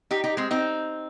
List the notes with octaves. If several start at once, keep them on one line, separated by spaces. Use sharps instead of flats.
D#4 G4
D#4 G4
G#3 C4
C4 D#4